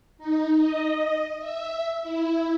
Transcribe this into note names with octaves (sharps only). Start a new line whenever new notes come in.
D#4
D#5
E5
E4